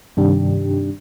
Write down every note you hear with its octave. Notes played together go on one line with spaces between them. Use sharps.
G2 C3 D#3 G3 D4 G4